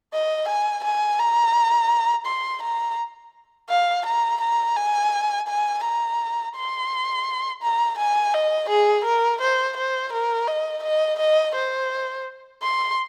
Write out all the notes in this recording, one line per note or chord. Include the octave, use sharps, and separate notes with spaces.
D#5
G#5
G#5
A#5
C6
A#5
F5
A#5
A#5
G#5
G#5
A#5
C6
A#5
G#5
D#5
G#4
A#4
C5
C5
A#4
D#5
D#5
D#5
C5
C6